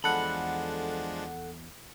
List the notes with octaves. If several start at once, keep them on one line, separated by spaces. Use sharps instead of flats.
E2 F3 G#3 D4 A4 F#5 B5